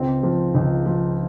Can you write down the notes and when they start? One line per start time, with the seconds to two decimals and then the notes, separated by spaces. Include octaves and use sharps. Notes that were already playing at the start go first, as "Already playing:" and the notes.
Already playing: C#2 C4
0.23 F3
0.55 C#2
0.86 F3